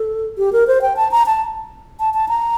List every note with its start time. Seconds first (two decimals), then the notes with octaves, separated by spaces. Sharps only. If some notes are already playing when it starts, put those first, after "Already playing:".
Already playing: A4
0.38 G4
0.53 A#4
0.67 C5
0.82 G5
0.96 A5
1.11 A#5
1.26 A5
2.00 A5
2.14 A5
2.29 A#5